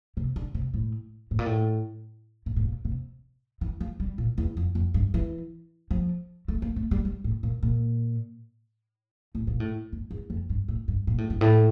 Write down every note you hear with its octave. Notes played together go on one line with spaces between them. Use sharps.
C3
D3
C3
A2
A2
A#2
A2
A#2
A2
A#2
C3
E3
F3
G3
A#2
E2
F2
F2
G2
E3
F3
A3
A#3
A3
G3
G3
A2
A#2
A#2
A2
A#2
A2
G2
E2
F2
G2
A2
G2
A#2
A2
G2
A2